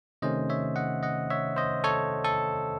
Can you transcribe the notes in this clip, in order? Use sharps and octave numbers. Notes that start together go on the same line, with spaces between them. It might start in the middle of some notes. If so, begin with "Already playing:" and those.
C3 D#3 A3 C#4 C5 D#5
C#5 E5
D#5 F#5
D#5 F#5
C#5 E5
C5 D#5
A4 C#5
A4